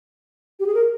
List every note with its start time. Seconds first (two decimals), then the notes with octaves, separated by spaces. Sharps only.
0.60 G4
0.67 G#4
0.75 A#4